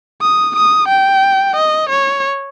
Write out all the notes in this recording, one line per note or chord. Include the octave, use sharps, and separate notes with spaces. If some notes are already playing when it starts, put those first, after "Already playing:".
D#6
D#6
G5
D#5
C#5